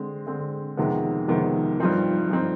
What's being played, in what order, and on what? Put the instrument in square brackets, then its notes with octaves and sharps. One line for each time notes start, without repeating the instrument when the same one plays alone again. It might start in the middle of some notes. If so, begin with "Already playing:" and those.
Already playing: [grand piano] D3 G#3 C4
D3 G#3 C4
F2 C3 D#3 G#3 B3
F2 C3 D#3 G#3 B3
G2 F3 C4 D#4
G2 F3 C4 D#4